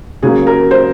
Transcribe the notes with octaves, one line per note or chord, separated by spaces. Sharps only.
C#3 F#3 A#3 G#4
A#4
C5